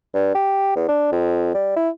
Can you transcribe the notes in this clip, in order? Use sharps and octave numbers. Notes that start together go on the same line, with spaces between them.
G2
G4
E2
D4
F2
G3
E4